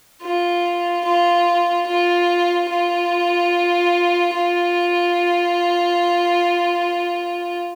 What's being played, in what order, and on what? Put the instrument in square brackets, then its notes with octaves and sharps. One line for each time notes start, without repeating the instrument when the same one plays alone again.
[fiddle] F4
F4
F4
F4
F4